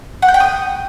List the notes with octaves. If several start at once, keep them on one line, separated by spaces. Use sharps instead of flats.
F#5
G6
G5
D#6